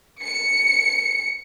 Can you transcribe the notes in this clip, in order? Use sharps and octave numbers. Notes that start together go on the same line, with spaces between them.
C#7